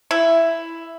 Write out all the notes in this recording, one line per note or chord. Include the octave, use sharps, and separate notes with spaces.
E4